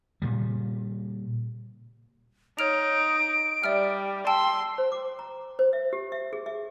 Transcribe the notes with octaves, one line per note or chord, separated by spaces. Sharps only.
A#2 C#3 G3
D#4 C#5 F6 D7 F7
G3 D5 E5 F6
G5 A5 C6 E6
C5
D6
A#5
C5
E5
G4
E5
G#4
E5